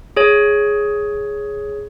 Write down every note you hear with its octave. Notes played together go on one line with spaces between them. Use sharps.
G#4 C#5